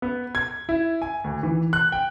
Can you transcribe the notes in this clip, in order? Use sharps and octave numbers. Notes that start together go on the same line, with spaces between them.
B3
G#6
E4
G#5
D2
E3
F#6
G5